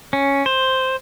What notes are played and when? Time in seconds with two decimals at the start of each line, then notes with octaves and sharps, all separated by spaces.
0.13 C#4
0.46 C5